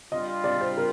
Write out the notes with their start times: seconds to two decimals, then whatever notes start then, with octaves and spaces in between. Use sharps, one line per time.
0.12 G3 D4 F4 D#5
0.44 D5
0.61 C5
0.77 A#4